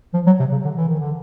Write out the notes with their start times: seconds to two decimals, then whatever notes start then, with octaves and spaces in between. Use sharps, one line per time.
0.14 F3
0.26 F#3
0.39 C3
0.52 C#3
0.65 D3
0.77 E3
0.88 D#3
0.99 D3